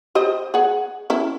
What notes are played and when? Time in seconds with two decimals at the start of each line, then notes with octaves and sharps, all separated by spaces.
0.15 G4 C5 D#5
0.54 G#4 F#5
1.10 C#4 E4